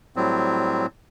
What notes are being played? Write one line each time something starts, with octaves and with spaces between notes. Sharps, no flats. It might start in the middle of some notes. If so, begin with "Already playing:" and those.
A2 F#3 G3 C4